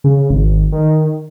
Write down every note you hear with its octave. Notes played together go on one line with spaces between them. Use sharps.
C#3
G#1
D#3